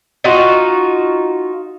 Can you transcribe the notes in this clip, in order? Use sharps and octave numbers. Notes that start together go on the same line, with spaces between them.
D#4 F4 F#4